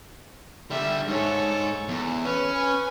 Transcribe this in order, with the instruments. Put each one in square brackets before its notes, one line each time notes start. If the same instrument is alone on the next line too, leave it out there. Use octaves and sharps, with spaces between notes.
[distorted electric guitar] D3 G3 [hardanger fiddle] E5
[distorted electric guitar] G#2 [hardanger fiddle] A4 C#5
[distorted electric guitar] E2
[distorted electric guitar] C#4 [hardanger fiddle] B4
[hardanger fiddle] B4 G#5